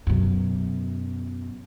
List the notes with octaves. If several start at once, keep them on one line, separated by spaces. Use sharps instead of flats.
F#2 B2